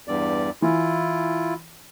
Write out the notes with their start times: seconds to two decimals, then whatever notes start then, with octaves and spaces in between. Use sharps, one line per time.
0.08 E2 G2 D5
0.62 E3 E4 F4